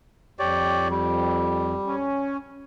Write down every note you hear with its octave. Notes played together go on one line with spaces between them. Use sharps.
F2 G4 C#5 D5
G3
C#4